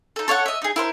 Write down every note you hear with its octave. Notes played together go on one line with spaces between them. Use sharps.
D#4 A4
A4 C#5 F5 F#5
D#5 E5
D#4 G#4
E4 A#4 C5